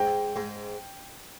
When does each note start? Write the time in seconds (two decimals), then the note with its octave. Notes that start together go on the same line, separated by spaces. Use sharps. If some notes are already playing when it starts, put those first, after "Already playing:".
Already playing: G#2 G5
0.36 G#2